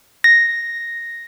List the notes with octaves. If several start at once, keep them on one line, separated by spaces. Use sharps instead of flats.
A#6